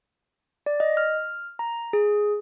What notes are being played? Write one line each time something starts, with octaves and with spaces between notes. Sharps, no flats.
D5
D#5
F6
A#5
G#4